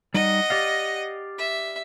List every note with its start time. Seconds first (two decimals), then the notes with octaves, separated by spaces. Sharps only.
0.14 G3 D#4 D#5 F#5
0.50 G4 D5 F5
1.38 E5